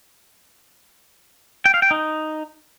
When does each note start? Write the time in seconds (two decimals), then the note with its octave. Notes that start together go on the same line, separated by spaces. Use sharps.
1.65 G5
1.74 F5
1.82 G5
1.91 D#4